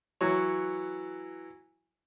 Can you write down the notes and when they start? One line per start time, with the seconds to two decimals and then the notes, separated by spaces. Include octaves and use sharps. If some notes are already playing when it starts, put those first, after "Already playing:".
0.21 E3 F#3 C#5